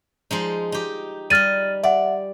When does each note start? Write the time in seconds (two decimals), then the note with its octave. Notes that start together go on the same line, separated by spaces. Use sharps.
0.31 F3 G#3 D#4
0.72 D#4 G4
1.30 G3 D#5 F6 A6 D#7
1.83 D5 E5 F#5